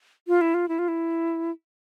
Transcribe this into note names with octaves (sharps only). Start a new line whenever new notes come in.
F4
E4
F4
E4
F4
E4